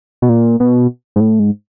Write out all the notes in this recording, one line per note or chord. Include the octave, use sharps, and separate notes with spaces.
B2
A#2
B2
G#2
A2
G#2